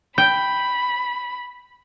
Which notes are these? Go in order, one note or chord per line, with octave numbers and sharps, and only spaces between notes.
G5 B5